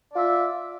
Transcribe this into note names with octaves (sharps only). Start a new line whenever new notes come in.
F4 D5 E5